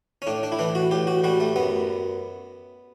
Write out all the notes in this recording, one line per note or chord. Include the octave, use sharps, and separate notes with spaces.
C#4
A2 D4
D4
E4
E3 D4
F#4
A2 G4
F#4
G3 F#4
A3
F#2 B3